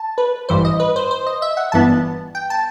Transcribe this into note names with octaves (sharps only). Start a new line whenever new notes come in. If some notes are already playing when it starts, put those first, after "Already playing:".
Already playing: A5
B4
A1 G2 E3 C5
D#5
B4
C5
C5
D#5
E5
F#5
G1 G2 E3 B3 A5
G5
A5